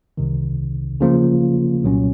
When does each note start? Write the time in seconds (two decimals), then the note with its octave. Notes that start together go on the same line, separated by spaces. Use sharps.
0.17 C2 C3 D#3
1.00 C#3 F3 A#3 F4
1.85 C2 A#2 F#3 C#4